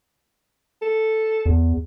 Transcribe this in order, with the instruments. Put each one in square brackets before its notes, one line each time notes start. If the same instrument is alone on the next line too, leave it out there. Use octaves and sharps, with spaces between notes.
[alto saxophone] A4
[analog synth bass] E2